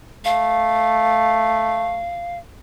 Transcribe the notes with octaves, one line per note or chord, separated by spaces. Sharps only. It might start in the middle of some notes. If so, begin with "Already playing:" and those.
A3 F5